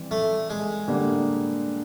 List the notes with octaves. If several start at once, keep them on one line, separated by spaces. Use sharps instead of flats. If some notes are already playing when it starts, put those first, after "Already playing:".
Already playing: E3 G3 C4
A3
G#3
D3 G3 A#3